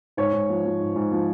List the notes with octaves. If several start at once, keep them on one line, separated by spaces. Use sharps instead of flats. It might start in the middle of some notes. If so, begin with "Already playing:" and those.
G#2 C#5
G#2
F3
F3
G#2
G#2
F3